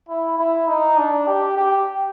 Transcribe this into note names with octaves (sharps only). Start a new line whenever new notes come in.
E4
E4
D#4
D4
G4
G4